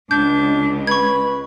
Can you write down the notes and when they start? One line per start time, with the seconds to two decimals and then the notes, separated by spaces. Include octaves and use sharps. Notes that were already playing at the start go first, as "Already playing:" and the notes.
0.11 C#2 D4 G6
0.87 B4 C#6 G#6